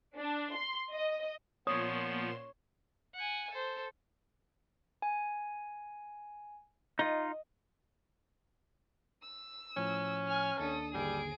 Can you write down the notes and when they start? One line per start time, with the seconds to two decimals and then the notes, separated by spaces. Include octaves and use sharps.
0.16 D4
0.54 C6
0.92 D#5
1.67 A#2 F3 B3 C#5 C6 D#6 E7
3.15 F#5 G#5
3.50 A4 C5
5.02 G#5
6.99 D#4 F4 D#5
9.22 E6
9.77 A2 F3 C#4
10.28 G#5 F6
10.60 D#2 D4 A4 D#6
10.94 G#1 D#2 D3 G3 G#4 D7